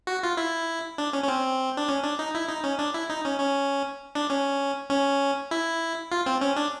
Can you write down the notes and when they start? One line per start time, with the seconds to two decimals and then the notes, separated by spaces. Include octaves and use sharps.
0.07 F#4
0.23 F4
0.37 E4
0.98 D4
1.13 C#4
1.24 C#4
1.28 C4
1.77 D4
1.89 C#4
2.04 D4
2.19 D#4
2.35 E4
2.49 D#4
2.64 C#4
2.79 D4
2.94 E4
3.10 D#4
3.25 C#4
3.40 C#4
4.15 D4
4.30 C#4
4.90 C#4
5.51 E4
6.12 F4
6.26 C4
6.41 C#4
6.56 D4